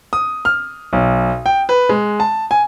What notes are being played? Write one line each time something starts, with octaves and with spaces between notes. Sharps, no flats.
D#6
F6
B1
G5
B4
G#3
A5
G#5